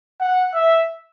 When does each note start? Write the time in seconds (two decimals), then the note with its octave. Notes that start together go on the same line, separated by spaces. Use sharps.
0.20 F#5
0.54 E5